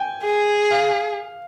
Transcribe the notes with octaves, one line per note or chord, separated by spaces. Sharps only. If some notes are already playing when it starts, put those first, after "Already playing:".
Already playing: G5 G#5
G#4
F5